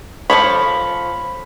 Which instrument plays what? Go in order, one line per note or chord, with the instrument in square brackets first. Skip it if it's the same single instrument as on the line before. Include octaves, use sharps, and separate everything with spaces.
[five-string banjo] F3 A4 C#5 [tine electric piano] B5